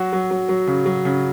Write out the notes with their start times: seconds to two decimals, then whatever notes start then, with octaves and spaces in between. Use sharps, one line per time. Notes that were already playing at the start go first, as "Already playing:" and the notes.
Already playing: F#3 F#4
0.13 F#3
0.31 F#3
0.49 F#3
0.67 C#3
0.86 F#3
1.05 C#3